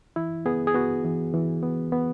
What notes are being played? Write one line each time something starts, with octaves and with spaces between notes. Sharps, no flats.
E3 E4
B3 G#4
G#4
B3 F#4
E3
E3
B3
B3